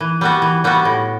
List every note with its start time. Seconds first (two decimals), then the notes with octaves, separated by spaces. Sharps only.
0.01 E3
0.21 G3 B3 F#4
0.42 E3
0.64 G3 B3 F#4
0.85 A2